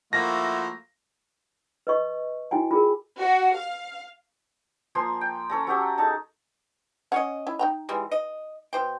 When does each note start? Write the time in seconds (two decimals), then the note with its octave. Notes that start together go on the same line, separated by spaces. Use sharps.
0.13 F3 A3 A#3 E4 F#4 A#6
1.87 B4 D#5 C#6
2.51 E4 F#4 G5 G#5
2.71 F4 G#4 A#4
3.20 F#4
3.56 F5
4.95 F3 A#3 G#5 C6
5.21 G5
5.50 C#4 A4 A#5
5.67 F#3 C#4 G4 E5
5.98 D#4 G#4 A4 A5
7.12 C#4 C#5 D#5 F#5
7.47 E4
7.59 D#4 G5 A#5
7.89 E3 G3 G#3
8.11 D#5
8.73 B2 C5 G5